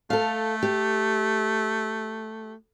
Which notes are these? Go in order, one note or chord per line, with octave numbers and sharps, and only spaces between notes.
A3 A4 F5
G4